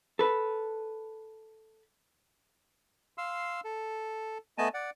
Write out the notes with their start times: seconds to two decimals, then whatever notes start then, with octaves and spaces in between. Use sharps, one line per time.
0.19 A4 B4
3.18 F5 C6 E6
3.64 A4
4.58 A3 B3 D#5 G#5 A5
4.74 D5 F#5